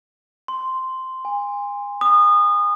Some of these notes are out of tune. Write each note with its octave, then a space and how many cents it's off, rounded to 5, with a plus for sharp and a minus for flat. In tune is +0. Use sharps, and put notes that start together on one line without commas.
C6 -5
G#5 -30
D#6 -25